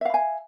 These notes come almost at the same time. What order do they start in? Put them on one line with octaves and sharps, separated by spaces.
E5 F5 B5 G#5